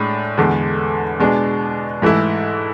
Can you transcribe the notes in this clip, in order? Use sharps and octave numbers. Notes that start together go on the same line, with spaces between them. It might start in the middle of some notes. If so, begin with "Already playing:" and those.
Already playing: A2 G#3 D4
E2 D3 G#3
B2 G#3 D4
G#2 E3 A3 E4